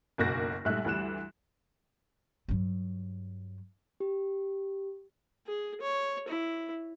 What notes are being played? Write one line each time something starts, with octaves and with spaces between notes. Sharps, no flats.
F#1 B1 A#3 F#4 F#6 A#6
A#1 G#2 G3 A3 E5 F#6
D2 E3 G3 F#6 E7
G2 F#3
G4
G#4
C#5
E4